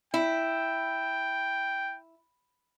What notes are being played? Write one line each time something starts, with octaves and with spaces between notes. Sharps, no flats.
E4 G5